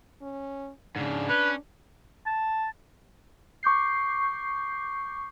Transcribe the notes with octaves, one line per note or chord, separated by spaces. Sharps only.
C#4
G#2 C#3 D4
C#4 B4
A5
C#6 D6 G6 C7